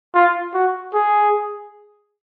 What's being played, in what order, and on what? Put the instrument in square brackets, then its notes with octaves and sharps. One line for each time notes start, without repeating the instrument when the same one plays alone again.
[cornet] F4
F#4
G#4